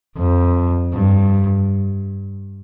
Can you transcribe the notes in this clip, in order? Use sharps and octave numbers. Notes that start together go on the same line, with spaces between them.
F2
G2